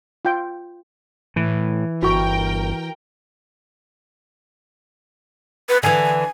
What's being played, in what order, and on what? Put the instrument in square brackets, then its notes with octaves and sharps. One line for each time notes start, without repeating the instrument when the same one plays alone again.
[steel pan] F4 G5
[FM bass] A2 [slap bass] E3
[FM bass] G1 [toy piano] F#4 C#6 [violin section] A#4 G5
[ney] B4
[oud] D3 E3 [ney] G#5